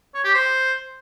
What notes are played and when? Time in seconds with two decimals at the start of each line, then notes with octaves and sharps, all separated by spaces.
0.14 C#5
0.24 G4
0.34 C5